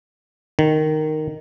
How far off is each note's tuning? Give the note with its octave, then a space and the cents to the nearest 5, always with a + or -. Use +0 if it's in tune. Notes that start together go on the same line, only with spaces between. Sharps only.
D#3 -10